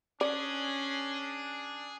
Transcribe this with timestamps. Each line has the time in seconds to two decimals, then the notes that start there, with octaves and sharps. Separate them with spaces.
0.21 C#4 D4 G#4 D5